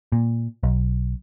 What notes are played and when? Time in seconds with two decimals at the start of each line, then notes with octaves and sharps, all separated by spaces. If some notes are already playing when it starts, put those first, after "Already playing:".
0.12 A#2
0.63 B1